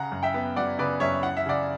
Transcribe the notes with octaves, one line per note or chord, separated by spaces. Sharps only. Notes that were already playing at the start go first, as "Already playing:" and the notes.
Already playing: C#3 F#5 A#5
F#2
E5 G5
B3
F#3 D5 F#5
C#3 B4 D5
F#2 C#5 E5
E3 F#5
E5
C#3 D5 F#5